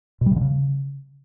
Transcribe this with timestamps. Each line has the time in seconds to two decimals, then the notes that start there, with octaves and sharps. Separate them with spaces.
0.21 B2
0.26 G3
0.31 C3
0.36 D3
0.41 C#3